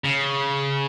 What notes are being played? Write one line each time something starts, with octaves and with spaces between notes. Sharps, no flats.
C#3